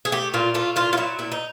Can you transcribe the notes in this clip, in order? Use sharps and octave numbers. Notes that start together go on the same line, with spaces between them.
G#4
A3 G4
A#2 F4
A3 F4
A#2 F4
F4
F#3 E4
A#2 E4
D#4